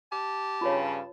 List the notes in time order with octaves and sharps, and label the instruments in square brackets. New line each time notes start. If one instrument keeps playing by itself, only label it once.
[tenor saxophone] G4 [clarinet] A5
[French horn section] G2 C#3 [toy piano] F4 B4 C#5